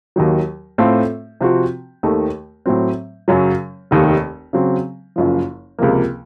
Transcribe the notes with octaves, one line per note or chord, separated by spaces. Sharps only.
D#2 D#3 F#3
A2 A3 C4 F4 A4
C3 F3 C4 F#4
D#2 D#3 A3
A2 F#3 C4
F#2 C#3 F#3
F1 D#2 D#3
C#3 F#3 C4
F#1 F#2 F3
C#2 C3 F3 A#3